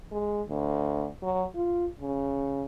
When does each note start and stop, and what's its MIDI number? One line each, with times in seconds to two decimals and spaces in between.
0.12 0.42 56
0.49 1.07 38
1.23 1.43 54
1.55 1.86 65
2.00 2.65 49